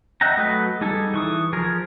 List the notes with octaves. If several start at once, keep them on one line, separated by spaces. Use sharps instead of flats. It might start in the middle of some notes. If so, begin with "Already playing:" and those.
D#5 E5 F#5 G5 A#5
F#3 A3 F#4 B4 D#5
G3 D#4 G#4 A4
E3 C#6 D#6
F3 G#4 A#4